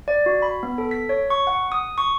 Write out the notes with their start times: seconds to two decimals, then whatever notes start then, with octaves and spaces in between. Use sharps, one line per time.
0.08 D5
0.26 F#4
0.42 B5
0.63 B3
0.78 A4
0.91 B6
1.09 C#5
1.30 C#6
1.47 F#5
1.72 D#6
1.98 C#6